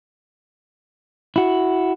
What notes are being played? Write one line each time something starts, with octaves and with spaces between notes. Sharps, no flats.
E4 F#4